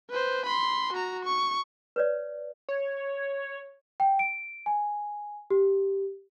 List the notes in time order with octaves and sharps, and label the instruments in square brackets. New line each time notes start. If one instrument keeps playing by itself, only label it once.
[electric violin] B4 C5
B5 C6
F#4 A#5
C#6
[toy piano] B4 C#5 D5
[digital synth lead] C#5
[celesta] G5
D7
G#5
G4